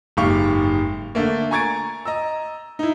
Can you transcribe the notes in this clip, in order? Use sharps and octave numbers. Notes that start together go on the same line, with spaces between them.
F#1 G#2 G4 F5 C#6
D3 A3 A#3
G#5 A#5 C#6 G#6 A6 D7
D#5 A#5 E6
D#4 E4